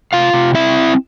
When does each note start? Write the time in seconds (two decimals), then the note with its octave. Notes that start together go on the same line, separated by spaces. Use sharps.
0.13 C3 F4 F5
0.33 C3
0.55 C4 E4 E5